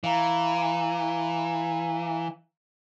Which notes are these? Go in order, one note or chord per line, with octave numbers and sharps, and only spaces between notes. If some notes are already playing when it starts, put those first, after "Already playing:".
E3 F5 A#5